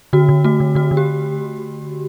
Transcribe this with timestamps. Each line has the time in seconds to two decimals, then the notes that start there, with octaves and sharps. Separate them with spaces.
0.13 D3 F#4
0.29 D3
0.44 A3 F#4
0.60 D3
0.75 D3 F#4
0.91 D3
0.97 G4